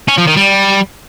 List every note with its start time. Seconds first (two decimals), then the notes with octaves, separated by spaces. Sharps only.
0.09 C#4
0.18 F3
0.27 D#3
0.37 G3